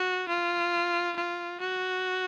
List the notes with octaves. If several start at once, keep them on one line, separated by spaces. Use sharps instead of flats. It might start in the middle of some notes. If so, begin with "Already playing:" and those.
Already playing: F#4
F4
F4
F#4